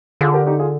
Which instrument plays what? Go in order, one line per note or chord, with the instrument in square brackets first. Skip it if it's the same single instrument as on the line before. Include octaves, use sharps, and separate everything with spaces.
[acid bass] D3 [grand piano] F4 G#4
[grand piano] G4 A#4
D#4 G4
F4 G#4